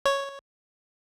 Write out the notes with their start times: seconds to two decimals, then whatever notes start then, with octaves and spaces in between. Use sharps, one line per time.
0.06 C#5